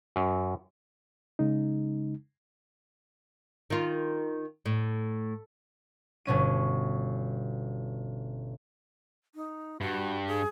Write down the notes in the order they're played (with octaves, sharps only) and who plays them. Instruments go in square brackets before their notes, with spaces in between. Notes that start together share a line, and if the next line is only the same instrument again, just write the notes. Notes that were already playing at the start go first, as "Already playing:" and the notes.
[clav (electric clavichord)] F#2
[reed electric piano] C#3 G#3 D#4
[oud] D#3 F4
A2
[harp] G1 B2 C#4 D#7
[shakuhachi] D#4
[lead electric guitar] G2 [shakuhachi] F#4
[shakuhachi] G#4